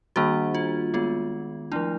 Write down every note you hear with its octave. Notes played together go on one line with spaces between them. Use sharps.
D#3 G3 A#3 D4 F#4
F4
D#3 G#3 B3 F4
F3 A3 D4 E4